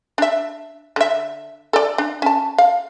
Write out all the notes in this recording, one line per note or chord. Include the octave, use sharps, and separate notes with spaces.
D4 E5
D3 E5
A4 D5
D4
C#4 A5
F5